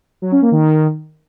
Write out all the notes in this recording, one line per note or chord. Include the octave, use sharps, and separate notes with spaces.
F#3
C#4
A#3
D#3